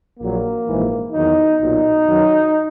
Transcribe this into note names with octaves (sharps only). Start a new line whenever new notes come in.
A#1 A#2 F#3 A#3
A#1 G#2 E3
E2 D#3 F#3 D#4
B1 A#2 F#3 D#4
F#2 D#3 F#3